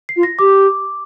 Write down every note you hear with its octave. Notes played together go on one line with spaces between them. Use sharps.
C7
F4
A#6
G4 D6